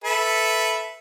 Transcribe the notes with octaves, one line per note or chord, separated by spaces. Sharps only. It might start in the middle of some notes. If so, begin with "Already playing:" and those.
A4 B4 E5